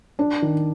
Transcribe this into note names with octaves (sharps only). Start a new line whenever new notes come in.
D4
D#3